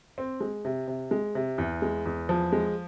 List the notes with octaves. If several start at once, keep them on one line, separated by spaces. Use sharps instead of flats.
C4
G#3
C3
C3
G#3
C3
E2
G#3
E2
F3
G#3